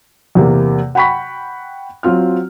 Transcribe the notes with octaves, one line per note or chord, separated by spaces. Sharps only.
E2 C3 A#3
F#5 G5 B5 C#6 B6
F#3 C4 F4 F6